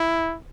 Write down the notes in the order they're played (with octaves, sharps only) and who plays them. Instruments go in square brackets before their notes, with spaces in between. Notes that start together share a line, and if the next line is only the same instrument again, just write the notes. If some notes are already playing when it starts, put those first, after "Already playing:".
Already playing: [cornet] E4